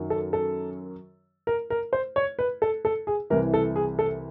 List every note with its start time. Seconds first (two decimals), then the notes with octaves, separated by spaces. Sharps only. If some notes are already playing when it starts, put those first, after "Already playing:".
Already playing: F#2 D#3 F#3
0.10 A4
0.33 A4
1.47 A#4
1.70 A#4
1.93 C5
2.16 C#5
2.39 B4
2.62 A4
2.85 A4
3.07 G#4
3.30 C2 C3 E3 A#4
3.54 A4
3.76 G#4
3.99 A4